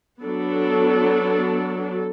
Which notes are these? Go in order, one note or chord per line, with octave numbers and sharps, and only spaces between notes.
F#3 B3 D4 A4